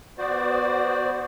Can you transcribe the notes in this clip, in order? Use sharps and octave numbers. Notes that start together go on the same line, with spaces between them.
B3 F#4 C5 D5